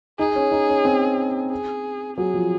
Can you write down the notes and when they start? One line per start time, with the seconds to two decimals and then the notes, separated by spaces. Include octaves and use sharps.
0.19 D#4 G#4
0.36 C#4
0.51 D#4
0.69 C#4
0.85 C4
1.51 G#4
2.17 F#3 G#4
2.34 F3